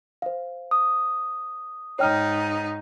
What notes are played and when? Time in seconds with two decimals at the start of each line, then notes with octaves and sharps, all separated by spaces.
0.22 C5 F5
0.71 D#6
1.99 G#2 D#4 C#5 G5 F6